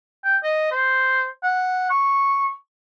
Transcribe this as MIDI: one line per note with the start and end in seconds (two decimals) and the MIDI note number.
0.24 0.37 79
0.43 0.66 75
0.71 1.27 72
1.43 1.88 78
1.90 2.52 85